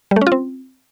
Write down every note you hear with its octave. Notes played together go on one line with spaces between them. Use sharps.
G3
A3
C#4
F4
C4